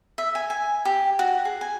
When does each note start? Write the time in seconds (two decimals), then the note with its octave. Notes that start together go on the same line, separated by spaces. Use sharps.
0.18 E5
0.35 G#5
0.50 G#5
0.85 G4
1.19 F#4
1.45 G#4
1.61 G#5